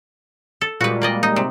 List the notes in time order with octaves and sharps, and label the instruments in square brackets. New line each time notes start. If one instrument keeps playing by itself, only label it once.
[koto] A4
[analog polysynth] A#2 G3 G#3 [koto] F#4 B4
[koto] A#3 D5 D#5
D#4
C3